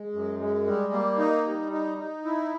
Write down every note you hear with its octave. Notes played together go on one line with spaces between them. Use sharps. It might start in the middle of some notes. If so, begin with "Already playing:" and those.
Already playing: G#3
F#2
G#3
G3
A#3
D#4
G3
D#4
D#4
E4